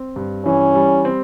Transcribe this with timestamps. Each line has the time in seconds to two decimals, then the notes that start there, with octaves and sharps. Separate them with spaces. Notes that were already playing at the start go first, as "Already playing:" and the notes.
Already playing: C4
0.16 G2
0.45 E3 C#4
0.75 G3
1.05 C4